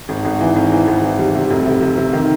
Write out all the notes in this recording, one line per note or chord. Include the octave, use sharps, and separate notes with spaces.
G#1
G#1
E3
G#1
E3
G#1
E3
G3
C3
F1
C3
C3
C3
D#3